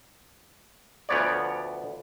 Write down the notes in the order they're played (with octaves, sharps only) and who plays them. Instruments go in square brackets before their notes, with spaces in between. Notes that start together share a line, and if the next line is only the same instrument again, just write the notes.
[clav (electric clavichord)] D2 F3 B3 C#5 D5